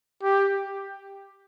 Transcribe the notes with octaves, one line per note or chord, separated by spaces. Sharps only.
G4